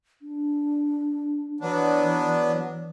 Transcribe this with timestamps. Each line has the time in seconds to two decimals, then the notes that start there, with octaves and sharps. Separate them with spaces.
0.22 D4
1.60 E3 F#3 B3 D4